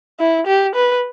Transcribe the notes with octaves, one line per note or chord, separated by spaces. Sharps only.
E4
G4
B4